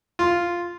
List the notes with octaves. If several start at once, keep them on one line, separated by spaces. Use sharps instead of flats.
F4